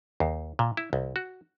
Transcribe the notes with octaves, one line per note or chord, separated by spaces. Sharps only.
D#2
A#2
E4
C2
F#4